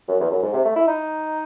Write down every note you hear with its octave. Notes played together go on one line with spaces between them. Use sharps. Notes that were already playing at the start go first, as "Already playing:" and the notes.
F#2
E2
F#2
G#2
C3
A3
E4
D#4